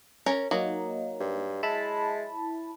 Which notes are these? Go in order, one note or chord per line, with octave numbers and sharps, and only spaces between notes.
C#4 A#4 A#5
F#3 A#3 D#4
G2
G#3 E4 A5 B5